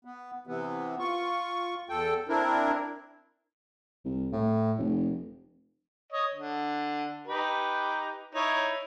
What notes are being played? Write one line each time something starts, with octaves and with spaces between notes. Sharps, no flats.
B3
C3 E3 B3
F4 C#6
E2 A4 G5
C4 D4 E4 A#4
C2
A2
F1
C#5 D#5
D3
D#4 G4 B4
D#4 E4 C#5